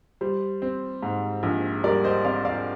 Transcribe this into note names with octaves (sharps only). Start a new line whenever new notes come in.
G3 C5
C4
G#2
A#1
G3 A#4 D5
C5 D#5
C4 D5 F5
D5 F5